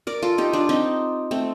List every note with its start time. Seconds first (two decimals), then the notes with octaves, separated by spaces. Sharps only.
0.07 A#4 D5
0.22 F4 A4
0.38 D#4 G4
0.53 D4 F4
0.69 C4 D#4
1.31 A3 C4